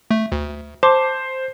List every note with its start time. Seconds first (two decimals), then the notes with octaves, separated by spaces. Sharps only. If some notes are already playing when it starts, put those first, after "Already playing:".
0.11 A3
0.32 D2
0.83 C5 A5 C6 D6